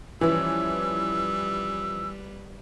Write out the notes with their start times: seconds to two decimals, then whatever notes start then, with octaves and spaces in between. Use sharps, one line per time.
0.21 E3 F3 G3 C#4 E4 B4 E6